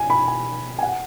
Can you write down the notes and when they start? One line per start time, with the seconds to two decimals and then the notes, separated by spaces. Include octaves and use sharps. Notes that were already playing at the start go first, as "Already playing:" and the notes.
Already playing: G#5
0.10 B5
0.28 G#5
0.79 G#5
0.82 F#5